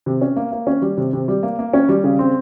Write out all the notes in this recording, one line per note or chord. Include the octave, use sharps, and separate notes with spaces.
C3
C#4
A#3
A#3
C#4
G3
C3
C3
G3
A#3
A#3
C#4
G3
C#3
C4